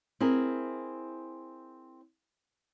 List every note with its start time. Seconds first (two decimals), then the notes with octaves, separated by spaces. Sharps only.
0.20 C4 E4 G#4 A#4